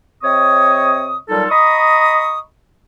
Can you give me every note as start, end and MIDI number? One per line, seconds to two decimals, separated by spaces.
0.23 1.17 48
0.23 1.17 60
0.23 1.17 73
0.23 1.17 75
0.23 1.17 85
0.23 1.17 87
1.29 1.45 46
1.29 1.45 54
1.29 1.45 55
1.29 1.45 63
1.29 1.45 65
1.29 1.45 69
1.50 2.39 75
1.50 2.39 82
1.50 2.39 83
1.50 2.39 85
1.50 2.39 87